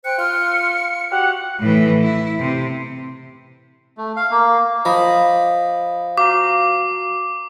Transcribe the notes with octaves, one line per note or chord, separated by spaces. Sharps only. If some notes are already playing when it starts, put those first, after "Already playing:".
C5 G5 F#6 C#7
F4 C6 F6
F#4 G4 F#5
A2 E3
E4
C3
A3
F5
A#3
F3 D#5 B5 D#6
F#4 F5 A#5 D6